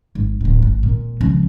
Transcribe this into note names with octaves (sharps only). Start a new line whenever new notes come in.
G#1
D1 A1
G#1
A#2
C#2 F3